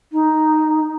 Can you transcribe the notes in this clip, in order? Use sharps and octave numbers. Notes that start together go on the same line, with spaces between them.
D#4